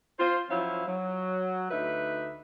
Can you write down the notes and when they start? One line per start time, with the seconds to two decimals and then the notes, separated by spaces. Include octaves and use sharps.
0.19 F4 C5
0.49 F3 F#3 C#4 E4 F5
0.86 F#3
1.71 D2 D#4 B4 E5